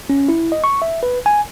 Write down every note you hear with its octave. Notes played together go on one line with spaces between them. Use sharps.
C#4
E4
D#5
C#6
E5
B4
G#5